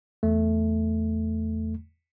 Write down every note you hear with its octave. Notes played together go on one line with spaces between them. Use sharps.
E2 A3